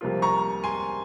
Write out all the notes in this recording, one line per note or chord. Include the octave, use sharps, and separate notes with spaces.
C2 C3 F3 A#3 F4
A#5 C#6
G#5 C6